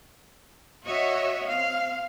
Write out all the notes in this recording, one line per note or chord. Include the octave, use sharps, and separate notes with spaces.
F#4 C#5 D#5 E5
C4 F5